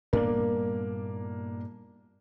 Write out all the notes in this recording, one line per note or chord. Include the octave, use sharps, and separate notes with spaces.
G2 A#2 A#3 B3 D4 A#4